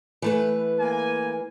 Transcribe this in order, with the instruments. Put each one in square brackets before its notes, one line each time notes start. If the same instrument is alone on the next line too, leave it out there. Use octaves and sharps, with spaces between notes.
[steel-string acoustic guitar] E3 A3 B4
[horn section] A#3 G#5